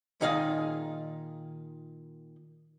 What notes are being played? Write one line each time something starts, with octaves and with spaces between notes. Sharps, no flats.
A#2 D#3 D#4 G#4 D#5 F5